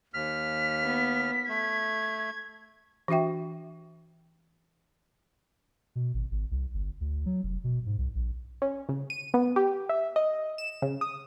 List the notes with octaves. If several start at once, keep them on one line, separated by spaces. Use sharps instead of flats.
D#2 F6 B6
B3
A3 G#6
E3 D4 F#4 E5 G5
B2
G#1
G#1
C2
G1
D2
F#3
F1
B2
G#2
C2
A#1
C#4
C#3
D#7
B3
G4
E5
D#5
E7
C#3
D#6